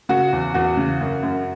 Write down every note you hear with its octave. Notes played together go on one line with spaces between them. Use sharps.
C#3 F#4
E2
E2 F#4
C#3
F#2
F#2